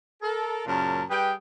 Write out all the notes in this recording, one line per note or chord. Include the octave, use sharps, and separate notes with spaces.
A4 A#4
F#2 A#2 C#3 A#4 A5
G3 G#4 B4 G5